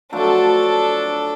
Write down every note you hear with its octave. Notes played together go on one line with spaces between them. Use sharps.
F3 F#3 A3 D4 A4